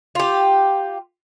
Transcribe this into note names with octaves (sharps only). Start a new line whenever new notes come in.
F4 G4